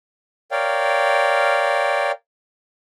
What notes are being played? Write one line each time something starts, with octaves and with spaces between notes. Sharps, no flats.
A#4 C#5 D5 F5 G5